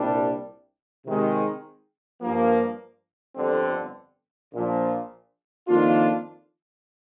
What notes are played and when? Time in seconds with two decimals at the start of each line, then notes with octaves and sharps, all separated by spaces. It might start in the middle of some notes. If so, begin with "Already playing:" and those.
Already playing: C2 A#2 G3 D4
1.04 C3 D#3 G#3
2.21 G2 F3 A#3
3.36 G1 F2 D3 G3 C4
4.53 A#1 A#2 F3
5.68 F2 D#3 A#3 D4 F4